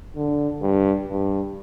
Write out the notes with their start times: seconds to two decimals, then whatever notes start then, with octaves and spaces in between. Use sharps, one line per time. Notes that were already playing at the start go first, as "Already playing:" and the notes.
0.16 D3
0.62 G2
1.09 G2